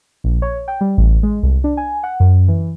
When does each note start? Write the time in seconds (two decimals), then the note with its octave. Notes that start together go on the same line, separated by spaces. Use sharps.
0.24 A#1
0.42 C#5
0.68 G5
0.81 G3
0.98 A1
1.23 G#3
1.43 C2
1.64 D4
1.77 G#5
2.03 F#5
2.20 F#2
2.48 E3